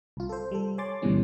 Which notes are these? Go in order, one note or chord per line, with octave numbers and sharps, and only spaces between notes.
C2 F4
A4 C5
G3 A4
C#5 G#5 C6 D6 A6
D2 G2 B2 E3 G3 C#4